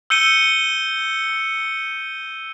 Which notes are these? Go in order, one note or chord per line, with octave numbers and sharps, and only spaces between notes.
E6 G6 C#7 D#7 G7